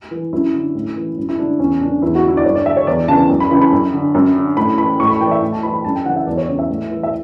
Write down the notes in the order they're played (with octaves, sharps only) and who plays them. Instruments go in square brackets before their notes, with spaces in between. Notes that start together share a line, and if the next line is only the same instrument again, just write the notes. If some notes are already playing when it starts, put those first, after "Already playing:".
[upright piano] E3
F#2 E4
D3
A2
E3
F#2
E4
D3 D4
E2 C#4
C#3 E3 D4
E2 E4
F#4
D3
E4
D5
G2 C#5
D5
D3 E5
C#5
E2 D5
C#3 E3 A5
F#2
B5
C#3 E3 B5
B5
F#2
D3
F#2
D3
A2 B5
E3 B5
A2 C#6
B5
E3 G5
D5
E5
A2
A5
E3 B5
B5
F#2 A5
G5
C#3 E3 F#5
E5
E2 D5
C#5
C#3 E3
E5
A2
E3
E5